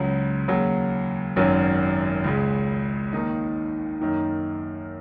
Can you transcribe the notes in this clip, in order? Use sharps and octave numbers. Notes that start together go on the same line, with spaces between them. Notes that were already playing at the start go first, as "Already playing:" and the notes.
Already playing: C#2 C#3 F#3 C#4
D#2 C#3 F#3
G#1 F#2 D#3 F#3 C#4
C#2 C#3 G#3
D#2 D#3 A#3 D#4
F#2 D#3 A#3 D#4